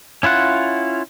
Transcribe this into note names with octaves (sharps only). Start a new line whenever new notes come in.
C#4 E4 F4 F#5